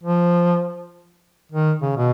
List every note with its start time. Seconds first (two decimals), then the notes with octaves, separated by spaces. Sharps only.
0.03 F3
1.52 D#3
1.82 C#3
1.97 B2